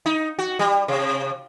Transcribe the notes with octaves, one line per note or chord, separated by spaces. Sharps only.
D#4
F#4
G3
C3